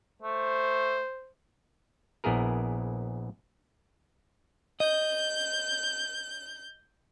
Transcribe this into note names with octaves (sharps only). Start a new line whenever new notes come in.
A3 C5
A#1 B3 E4 G#4 A#4
D#5 G6